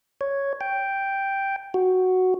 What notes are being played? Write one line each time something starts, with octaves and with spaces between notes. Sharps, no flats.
C#5
G5
F#4